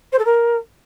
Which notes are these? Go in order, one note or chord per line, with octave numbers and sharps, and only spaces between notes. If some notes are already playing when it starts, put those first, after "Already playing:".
C5
A4
A#4